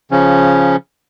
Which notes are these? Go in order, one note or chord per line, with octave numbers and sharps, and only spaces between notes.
C#3 F3 C#4